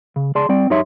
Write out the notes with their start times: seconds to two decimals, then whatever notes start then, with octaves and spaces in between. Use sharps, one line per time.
0.16 C#3
0.35 C#2 G#4 D5 A5 C6
0.49 G3 C4 D5 G5
0.70 F#2 D#4 G4 C#5 E5 C6